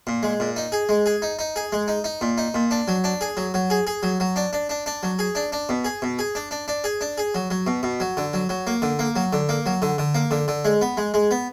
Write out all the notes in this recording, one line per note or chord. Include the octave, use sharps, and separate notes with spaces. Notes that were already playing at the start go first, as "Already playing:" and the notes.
A#2
G#3
A#2
D#4
G#4
G#3
G#4
D#4
D#4
G#4
G#3
D#4
D#4
A#2
D#4
A#2
D4
F#3
D4
G#4
F#3
F#3
G#4
G#4
F#3
F#3
D4
D4
D4
D4
F#3
G#4
D4
D4
B2
G#4
B2
G#4
D4
D4
D4
G#4
D4
G#4
F#3
F#3
B2
B2
F#3
D3
F#3
F#3
A#3
D3
A#3
F#3
D3
A#3
F#3
D3
D3
A#3
D3
D3
G#3
B3
G#3
G#3
B3